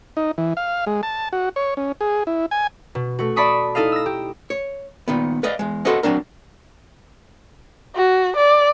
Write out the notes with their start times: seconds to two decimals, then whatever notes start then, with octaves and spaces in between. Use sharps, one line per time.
0.17 D#4
0.38 E3
0.57 F5
0.87 G#3
1.03 A5
1.33 F#4
1.56 C#5
1.77 C#4
2.01 G#4
2.27 E4
2.51 G#5
2.95 B2
3.19 A3 F#4
3.36 D5 E5 A5 B5 C#6 D#6
3.75 D#4 E4 A4 D#5 F5
3.92 E6 A#6
4.06 G4
4.50 C#5
5.08 A#2 D#3 B3
5.43 B4 D5 D#5 F5
5.59 E2 G#3
5.85 F#4 A4 B4 C5 D#5 F#5
6.03 F#3 C4 D4 A#4
7.96 F#4
8.36 D5